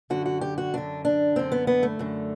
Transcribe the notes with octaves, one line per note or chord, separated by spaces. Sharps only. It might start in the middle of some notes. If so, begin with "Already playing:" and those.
F#2 D3 F#4
F#4
G4
F#4
F#2 D3 D4
D4
F#2 D3 C4
B3
B3
A3
F#2 D3